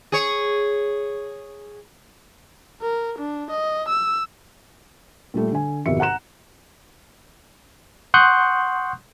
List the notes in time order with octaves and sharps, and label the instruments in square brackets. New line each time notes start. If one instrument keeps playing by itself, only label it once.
[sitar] G#4 C#5
[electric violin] A#4
D4
D#5
E6
[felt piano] A#2 G3 A3
D3 G#5
G#1 F2 B2 G4 E5 C#7
F#5 A#5 F#6 E7
[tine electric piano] F#5 C6 C#6 D#6 F#6 G6